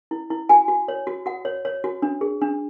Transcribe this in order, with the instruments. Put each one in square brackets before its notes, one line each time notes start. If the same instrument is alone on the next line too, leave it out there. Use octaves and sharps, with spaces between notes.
[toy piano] E4
E4
F#4 G#5
F#4
C#5
F#4
F#4 F#5
C#5
C#5
F#4
D4
G#4
D4